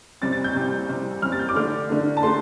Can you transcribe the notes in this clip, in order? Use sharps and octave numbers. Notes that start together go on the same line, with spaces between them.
C3 G3 C4 A6
A6
G6
C3 G3 C4
C3 G3 C4
C3 G3 C4 F6
A6
G6
D6
D3 A3 D4 F6
D3 A3 D4
A5
D3 A3 D4 C6